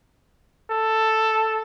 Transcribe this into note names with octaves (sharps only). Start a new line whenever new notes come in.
A4